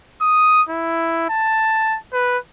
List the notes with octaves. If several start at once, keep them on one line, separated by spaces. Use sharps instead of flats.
D#6
E4
A5
B4